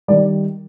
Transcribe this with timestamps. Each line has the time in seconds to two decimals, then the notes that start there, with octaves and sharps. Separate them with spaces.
0.08 D#3 G3 D5